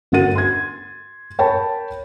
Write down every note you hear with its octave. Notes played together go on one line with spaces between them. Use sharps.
G1 F#4 A#4 F#5 A6 D#7
C6 G#6
A#4 C#5 G5 A5 B5